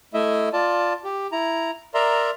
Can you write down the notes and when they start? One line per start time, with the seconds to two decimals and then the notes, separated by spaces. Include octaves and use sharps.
0.14 A3 E4 D#5 E5
0.53 F4 D5 A5
1.04 G4
1.32 E4 A#5
1.94 A#4 D5 E5 A#5 C6